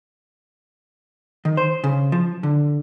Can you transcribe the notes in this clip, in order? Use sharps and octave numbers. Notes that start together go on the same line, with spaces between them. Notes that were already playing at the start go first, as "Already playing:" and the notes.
D#3
C5
C#3
F3
D3